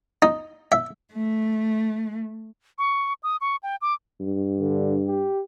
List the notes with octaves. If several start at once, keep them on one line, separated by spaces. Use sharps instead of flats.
D#4
E5
A3
C#6
D#6
C#6
G5
D6
G2
D3
G4